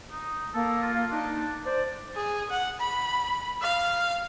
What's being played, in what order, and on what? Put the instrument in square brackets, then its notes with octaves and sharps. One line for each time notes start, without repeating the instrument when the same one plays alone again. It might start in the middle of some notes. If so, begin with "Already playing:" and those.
[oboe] D#4
[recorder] A#3 [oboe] A4
[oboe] F4
[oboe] D4 [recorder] D#4
[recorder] C5 [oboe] D5
[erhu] G#4
F#5
B5
F5